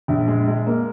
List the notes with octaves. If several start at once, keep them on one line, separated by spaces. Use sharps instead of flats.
A#1
G#3
G#3
A#3